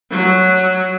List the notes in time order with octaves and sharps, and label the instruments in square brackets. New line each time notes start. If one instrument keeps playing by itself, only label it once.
[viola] F#3